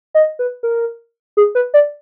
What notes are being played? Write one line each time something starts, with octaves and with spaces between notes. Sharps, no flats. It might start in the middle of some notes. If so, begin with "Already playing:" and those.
D#5
B4
A#4
G#4
B4
D5